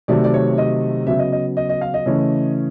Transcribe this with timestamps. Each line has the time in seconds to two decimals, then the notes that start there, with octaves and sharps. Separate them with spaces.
0.08 C3 D#3 F#3 A3 D5
0.24 D5
0.34 C#5
0.58 D#5
1.07 C#3 F#3 B3 E5
1.19 D#5
1.32 D#5
1.57 D#5
1.69 D#5
1.81 F5
1.94 D#5
2.06 C#3 E3 A3 C#4